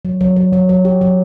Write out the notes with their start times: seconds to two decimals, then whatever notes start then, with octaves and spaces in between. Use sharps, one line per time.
0.05 F#3
0.21 F#3
0.36 F#3
0.53 F#3
0.69 F#3
0.85 G4
1.01 F#3